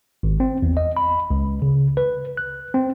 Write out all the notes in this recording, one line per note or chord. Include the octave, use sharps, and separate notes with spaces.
G#1
C4
E2
D#5
B5
C#2
C#3
B4
F#6
C4